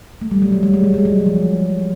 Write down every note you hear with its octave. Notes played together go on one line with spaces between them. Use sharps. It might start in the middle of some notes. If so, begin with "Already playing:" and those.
A3
G3
F#3
F#3
G3
G#3
G3
G#3
F#3
F3